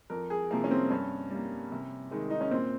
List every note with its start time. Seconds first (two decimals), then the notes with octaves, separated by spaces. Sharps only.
0.10 F2 A#4
0.30 G#4
0.51 C3 F3 A#3
0.64 C#4
0.71 C4
0.90 G2 C#4
1.30 G3 A#3
1.72 C3
2.11 D#3 G#3
2.30 D#4
2.41 C#4
2.51 A#2 C4